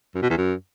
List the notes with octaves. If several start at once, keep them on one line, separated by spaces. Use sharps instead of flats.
F#2
B2
E2
F#2